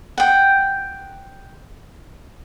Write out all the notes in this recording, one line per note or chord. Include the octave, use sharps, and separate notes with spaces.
F#5 G5